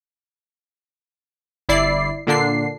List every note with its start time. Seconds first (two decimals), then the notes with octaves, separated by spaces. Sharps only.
1.69 G1 E4 D5 C7
2.27 A#2 D3 D4 C7